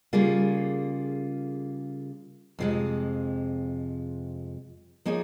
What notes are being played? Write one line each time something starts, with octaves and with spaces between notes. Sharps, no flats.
C#3 G3 A#3 F4 G#4
F2 C3 F3 G#3
F3 A#3 D#4 G#4 C#5